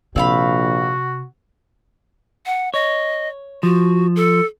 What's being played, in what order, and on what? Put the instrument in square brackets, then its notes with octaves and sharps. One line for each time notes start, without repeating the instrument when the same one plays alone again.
[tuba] A#1 [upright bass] C3 [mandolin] C4 F5 B5 [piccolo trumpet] F#4
[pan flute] F#5
[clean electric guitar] C#5 [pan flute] D#5
[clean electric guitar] F3 [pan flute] F#4
[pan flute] A4